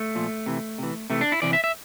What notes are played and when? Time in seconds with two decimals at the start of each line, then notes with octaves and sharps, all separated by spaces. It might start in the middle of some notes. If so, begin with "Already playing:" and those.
Already playing: A3
0.15 A#2 F3
0.46 C3 E3
0.78 C3 E3
1.10 C3 E3 A3
1.21 D4
1.32 E4
1.42 C3 E3 D5
1.53 E5
1.64 E5